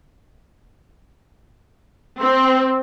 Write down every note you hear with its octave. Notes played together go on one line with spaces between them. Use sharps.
C4